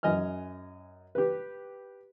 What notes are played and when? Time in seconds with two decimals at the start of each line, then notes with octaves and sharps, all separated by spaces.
0.03 F#2 D#5 G#5 F6
1.15 G4 B4